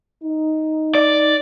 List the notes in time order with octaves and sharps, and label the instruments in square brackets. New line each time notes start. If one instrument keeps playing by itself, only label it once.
[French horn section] D#4
[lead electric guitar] D5